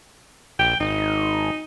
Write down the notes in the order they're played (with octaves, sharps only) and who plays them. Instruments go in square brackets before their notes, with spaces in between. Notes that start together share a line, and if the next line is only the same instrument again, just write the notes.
[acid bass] A#1 [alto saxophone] G5
[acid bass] G#1 [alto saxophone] D#4